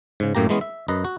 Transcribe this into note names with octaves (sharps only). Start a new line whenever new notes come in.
G#2 C#3
F#2 A2 A#3 G4 A#5
E3 G#3 B3 C#4
E5
F#2 B4 D#5 A#5
F#4